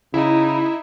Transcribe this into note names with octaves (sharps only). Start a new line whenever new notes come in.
C#3 D#4 E4